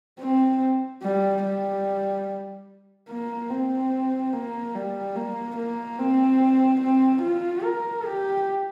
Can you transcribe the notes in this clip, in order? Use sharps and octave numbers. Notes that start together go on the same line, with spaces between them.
C4
G3
G3
A#3
C4
A#3
G3
A#3
A#3
C4
C4
F4
A#4
G4